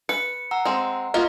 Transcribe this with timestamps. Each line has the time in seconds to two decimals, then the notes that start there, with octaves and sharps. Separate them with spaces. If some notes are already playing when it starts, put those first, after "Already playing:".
0.09 B4 C#7
0.51 F#5 A#5 E6
0.65 G#3 C4
1.14 A#3 B3 F4 F#4 D#5